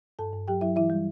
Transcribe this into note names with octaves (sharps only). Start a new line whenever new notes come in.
G2 A4 A5
G2
F#3 G4 G5
F#3 E4 E5
E3 E4 E5
G3